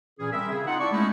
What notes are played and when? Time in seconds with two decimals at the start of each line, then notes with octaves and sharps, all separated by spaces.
0.20 A#2 E3 C#4 G#4
0.32 G3 C4 A#4 E5
0.51 C#3 G#4
0.67 C4 D#4 F4 F#5
0.80 E4 D5 A5 C#6
0.92 G#3 A3 B3 C#4 D#4 E4